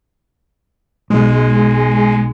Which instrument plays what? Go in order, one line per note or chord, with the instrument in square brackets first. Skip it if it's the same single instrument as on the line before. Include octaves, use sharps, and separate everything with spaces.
[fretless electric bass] B1 [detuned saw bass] G#3